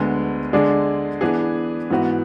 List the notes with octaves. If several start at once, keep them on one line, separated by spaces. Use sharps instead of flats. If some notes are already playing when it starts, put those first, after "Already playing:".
Already playing: D2 D3 G#3 B3
D3 G#3 D4 G#4 D5
E3 B3 D4 G#4
G#2 E3 B3 F#4